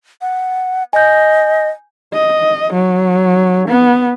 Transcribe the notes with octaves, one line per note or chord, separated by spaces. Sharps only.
F#5
D#5 G#5 G6
D#5
F#3
B3